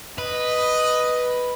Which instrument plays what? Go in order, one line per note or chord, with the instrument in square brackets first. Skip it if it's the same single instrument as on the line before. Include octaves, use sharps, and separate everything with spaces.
[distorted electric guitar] B4 [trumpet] D#5